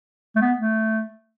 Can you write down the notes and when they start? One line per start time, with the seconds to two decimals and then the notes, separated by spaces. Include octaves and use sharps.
0.36 A3
0.41 B3
0.58 A3